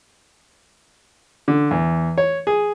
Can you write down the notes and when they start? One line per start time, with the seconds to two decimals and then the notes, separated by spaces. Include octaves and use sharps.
1.48 D3
1.71 E2
2.18 C#5
2.47 G#4